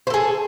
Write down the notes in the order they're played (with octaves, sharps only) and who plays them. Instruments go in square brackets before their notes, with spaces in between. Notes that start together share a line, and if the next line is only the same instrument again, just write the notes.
[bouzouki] C5
A4
G#4